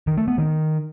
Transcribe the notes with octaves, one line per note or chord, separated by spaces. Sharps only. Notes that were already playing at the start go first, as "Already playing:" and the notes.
D#3
A3
B3
D#3